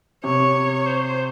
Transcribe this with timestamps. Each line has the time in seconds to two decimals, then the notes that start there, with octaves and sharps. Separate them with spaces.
0.24 C3 C#5
0.86 C5